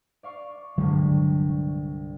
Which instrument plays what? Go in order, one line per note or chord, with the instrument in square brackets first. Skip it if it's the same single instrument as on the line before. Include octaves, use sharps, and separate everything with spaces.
[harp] D5 F5 C#6
[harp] C2 G2 [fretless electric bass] D3 F#3 G#3